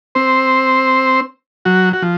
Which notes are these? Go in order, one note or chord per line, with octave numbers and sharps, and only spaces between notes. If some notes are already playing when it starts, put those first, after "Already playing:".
C4 C5
F#3 F#4
F#4
F3